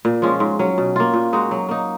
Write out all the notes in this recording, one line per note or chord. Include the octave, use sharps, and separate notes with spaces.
A#2
F3 G#3 C#4
G#2
F#3 C#4
B2
A#3 F4
A#2
G#3 D#4 F#4
F#3
A#3 D#4